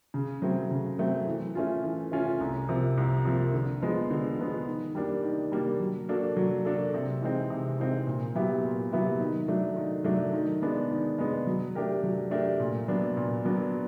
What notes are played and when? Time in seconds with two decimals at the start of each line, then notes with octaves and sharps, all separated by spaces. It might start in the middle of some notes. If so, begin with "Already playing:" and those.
0.14 C#3
0.42 F#3 A3 C4
0.71 C#3
0.99 F#3 A3 C4
1.27 E3
1.55 A3 C#4 F4
1.84 E3
2.12 A3 C#4 F4
2.40 C2
2.69 C3 F3 A#3
2.98 C2
3.25 C3 F3 A#3
3.54 D3
3.82 F3 G#3 B3
4.10 D3
4.39 F3 G#3 B3
4.67 D#3
4.95 G3 A#3 D4
5.23 D#3
5.52 G3 A#3 D4
5.80 F#3
6.09 A#3 D4 F#4 A4
6.37 F#3
6.65 A#3 D4 F#4 A4
6.94 C3
7.21 E3 G#3 C4 D#4
7.50 C3
7.78 E3 G#3 C4 D#4
8.07 A#2
8.35 F#3 B3 E4 G4
8.64 A#2
8.92 F#3 B3 E4 G4
9.20 D#3
9.48 F#3 A3 D4
9.76 D#3
10.04 F#3 A3 D4
10.33 D#3
10.62 G#3 B3 D4
10.91 D#3
11.18 G#3 B3 D4
11.47 F#3
11.75 A3 D4 G4 A#4
12.03 F#3
12.31 A3 D4 G4 A#4
12.60 A#2
12.88 F#3 B3 D4
13.17 A#2
13.45 F#3 B3 D4